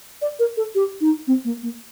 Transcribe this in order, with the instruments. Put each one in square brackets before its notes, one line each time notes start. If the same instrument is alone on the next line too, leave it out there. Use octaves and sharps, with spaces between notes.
[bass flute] D5
A#4
A4
G4
D#4
C4
A#3
A#3